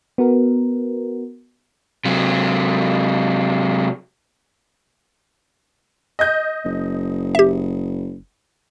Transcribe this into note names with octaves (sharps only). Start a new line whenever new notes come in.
B3 F#4 A#4
C3 F#3
D#5 G6
F#1
G4 E5